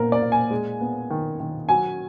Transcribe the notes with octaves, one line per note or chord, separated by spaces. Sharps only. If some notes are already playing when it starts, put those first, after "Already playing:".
Already playing: A#2 B3 A#4
D5
A#2
G#5
G#3
B3
D#3
D#3
F#3 G#5